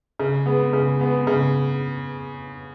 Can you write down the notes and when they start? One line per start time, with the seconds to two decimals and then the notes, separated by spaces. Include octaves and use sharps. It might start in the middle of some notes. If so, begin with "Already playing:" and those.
0.19 C#3
0.46 G#3 B3
0.73 C#3
1.00 G#3 B3
1.27 C#3